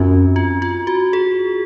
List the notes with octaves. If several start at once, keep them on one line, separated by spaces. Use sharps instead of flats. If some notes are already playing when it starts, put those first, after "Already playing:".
Already playing: F#2 C4 C#4 F4 F#4
F4
F4
F#4
G#4